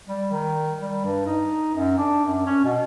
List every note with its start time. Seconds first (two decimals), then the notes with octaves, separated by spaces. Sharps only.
0.08 G3
0.32 D#3
0.82 G3
1.05 G2
1.26 D#4
1.75 F#2
1.98 D4
2.25 F#2
2.46 C#4
2.64 B2